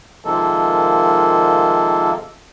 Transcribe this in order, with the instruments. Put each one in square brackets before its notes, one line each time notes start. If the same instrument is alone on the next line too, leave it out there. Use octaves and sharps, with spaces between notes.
[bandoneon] C3 D#3 F3 G#3 A#3 A4